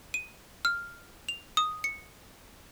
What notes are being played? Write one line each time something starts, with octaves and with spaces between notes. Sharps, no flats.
D#7
F6
F7
D#6
C#7